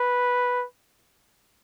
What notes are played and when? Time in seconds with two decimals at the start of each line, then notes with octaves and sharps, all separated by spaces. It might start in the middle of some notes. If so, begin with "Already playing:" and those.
Already playing: B4